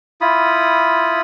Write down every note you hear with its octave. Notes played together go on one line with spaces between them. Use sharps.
E4 F4 B5 D#6